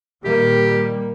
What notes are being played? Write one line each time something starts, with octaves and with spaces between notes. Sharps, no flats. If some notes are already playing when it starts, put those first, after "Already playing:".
A#2 D#3 G3 A#3 G4